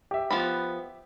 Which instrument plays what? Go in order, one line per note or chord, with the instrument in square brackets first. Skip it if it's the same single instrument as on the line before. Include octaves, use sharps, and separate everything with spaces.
[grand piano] G4 E5
[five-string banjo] F3 B3 B5